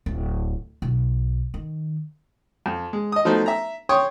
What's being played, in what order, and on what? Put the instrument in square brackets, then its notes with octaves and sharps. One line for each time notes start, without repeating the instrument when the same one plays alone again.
[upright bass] D1
B1
D#3
[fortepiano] F2
G#3
D#5 D#6
F3 F#3 A3 B3 D#4 C5
E5 A#5
C#5 G5 C6 C#6 D#6